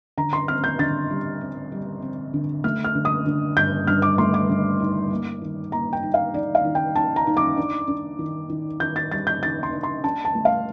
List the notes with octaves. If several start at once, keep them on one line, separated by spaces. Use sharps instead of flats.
D3 A#5
C6
C4 F6
G6
D3 A6
G3
C4
G3
C4
D3
A3 F6
F6
D3
D#6
D3
G2 G6
G2 F6
D6
A3 C6
D6
D3
D#4
A#3
D#3
A#3 A#5
G5
D#4
F5
D#4 D5
F5
D#3
G5
D#4 A5
A#5
D#4
D6
D4
D4
D#3
D#3
D#3 G6
A6
G3 A6
G6
D#3 A6
C6
D4
C6
D4 A5
A5
A3
F5